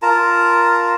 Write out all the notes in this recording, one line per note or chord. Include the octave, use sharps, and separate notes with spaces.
F4 A#4 A5 A#5